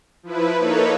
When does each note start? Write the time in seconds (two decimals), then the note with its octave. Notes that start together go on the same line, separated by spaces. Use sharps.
0.23 F3 E4 B4
0.60 A#3 D#4 A4 B4 C#5